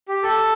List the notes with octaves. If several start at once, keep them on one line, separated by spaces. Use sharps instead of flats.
G4
A4